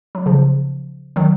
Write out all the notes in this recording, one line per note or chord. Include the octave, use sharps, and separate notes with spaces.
F#3
C#3 F3
D#3 F#3